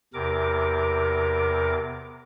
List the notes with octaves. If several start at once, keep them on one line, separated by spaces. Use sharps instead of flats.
E2 C3 A#4 D6